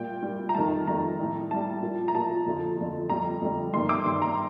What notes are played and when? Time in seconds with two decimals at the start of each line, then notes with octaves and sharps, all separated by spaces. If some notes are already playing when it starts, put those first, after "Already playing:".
Already playing: A#2 G3 G5
0.23 A#2 G3
0.49 A#5
0.55 F2 D#3 G3 A5
0.87 F2 D#3 G3 A#5
1.19 A2 G3
1.51 A2 G3 A5
1.82 A#2 F3
2.08 A#5
2.15 A#2 F3 A5
2.46 F2 D3 F3
2.78 F2 D3 F3
3.10 F2 D3 G3 A#5
3.41 F2 D3 G3
3.74 G2 D#3 G3 C6
3.89 D6
4.05 G2 D#3 G3 C6
4.22 A#5